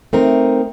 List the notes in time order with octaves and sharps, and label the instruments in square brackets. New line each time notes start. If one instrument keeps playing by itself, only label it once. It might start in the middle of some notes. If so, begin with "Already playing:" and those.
[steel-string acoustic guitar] A3 C4 D#4 A#4